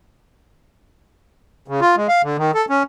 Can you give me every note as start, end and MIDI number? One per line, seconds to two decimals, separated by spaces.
1.68 1.80 49
1.81 1.96 65
1.97 2.07 56
2.08 2.22 77
2.23 2.37 50
2.38 2.51 51
2.54 2.65 69
2.70 2.83 61